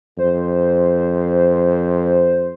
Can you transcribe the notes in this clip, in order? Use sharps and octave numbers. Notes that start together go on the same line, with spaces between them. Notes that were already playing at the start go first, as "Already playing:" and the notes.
F2 C5